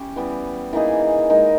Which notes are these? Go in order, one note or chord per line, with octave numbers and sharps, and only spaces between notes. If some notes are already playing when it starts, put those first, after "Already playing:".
Already playing: C#4 E4 G4
E3 G3 B3
E3 A#3 D#4 G#4
G#3 D#4 A#4